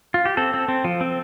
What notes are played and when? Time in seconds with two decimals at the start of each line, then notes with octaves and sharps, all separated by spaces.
0.14 F4
0.25 G4
0.37 C4 A4
0.54 C4
0.68 C4
0.84 F3
1.01 C4